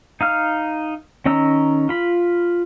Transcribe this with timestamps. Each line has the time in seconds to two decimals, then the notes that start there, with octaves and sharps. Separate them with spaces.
0.21 D#4 F5 F6
1.26 D#3 C#4 D#5 A#5 E6
1.89 F4 B5